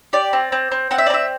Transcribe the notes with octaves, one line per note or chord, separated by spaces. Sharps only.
G4 D5
C4
C4
C4
C4 F#5
E5
D5
C4 E5